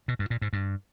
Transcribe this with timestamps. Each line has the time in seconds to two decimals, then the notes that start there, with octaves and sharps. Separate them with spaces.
0.08 B2
0.19 G2
0.30 A#2
0.42 G#2
0.53 G2